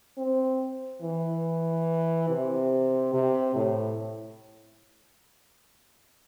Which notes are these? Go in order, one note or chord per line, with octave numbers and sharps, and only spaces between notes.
C4
E3
C3
C3
A2